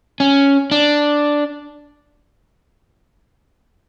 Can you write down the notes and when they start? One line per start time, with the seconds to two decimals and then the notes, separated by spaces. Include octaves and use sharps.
0.20 C#4
0.71 D4